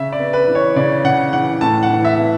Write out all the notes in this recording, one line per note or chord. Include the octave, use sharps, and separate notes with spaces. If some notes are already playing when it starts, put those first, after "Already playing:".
Already playing: C#3 E5
D5
B3
B4
E3
C#5
C#3 D5
C#3 F#5
E3 F#5
A2 A5
F#5
E3
E5
B3